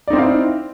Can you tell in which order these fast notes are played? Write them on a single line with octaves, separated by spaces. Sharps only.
D5 D#4 C4 E4 F5